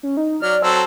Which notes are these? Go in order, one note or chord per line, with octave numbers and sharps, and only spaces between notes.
C#4
D#4
F#3 D5 F6
F#3 C4 A4 E6